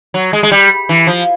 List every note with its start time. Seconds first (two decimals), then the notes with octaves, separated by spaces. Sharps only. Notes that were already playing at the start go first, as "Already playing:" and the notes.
0.14 F#3
0.33 G#3
0.43 G#3
0.51 G3
0.89 E3
1.07 F3